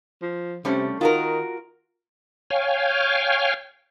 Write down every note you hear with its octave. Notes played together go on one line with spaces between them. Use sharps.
F3
C3 G3 A3 C#4
D#3 F4 F#4 A#4
C#5 F5 G5 G#5